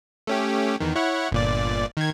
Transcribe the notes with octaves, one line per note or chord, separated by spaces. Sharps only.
A3 C#4 G4
E2 D#3
E4 C#5 F#5
G1 A#2 D5
D#3 G#6